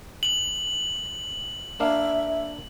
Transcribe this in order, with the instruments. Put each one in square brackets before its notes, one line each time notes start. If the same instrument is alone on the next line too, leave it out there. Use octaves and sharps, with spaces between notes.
[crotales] F#7
[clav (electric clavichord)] A#3 D4 F5 [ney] E5